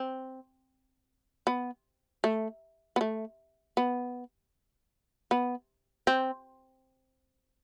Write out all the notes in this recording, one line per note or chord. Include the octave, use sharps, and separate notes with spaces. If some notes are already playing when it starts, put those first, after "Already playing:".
Already playing: C4
B3
A3
B3
A3
B3
B3
C4